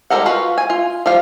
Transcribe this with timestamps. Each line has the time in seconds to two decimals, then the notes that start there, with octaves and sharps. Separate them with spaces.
0.10 G3 G#3 A4 A#4 F#5
0.26 F4 F#4 B4 F5
0.58 G#5
0.70 F4
1.06 F3 G3 F5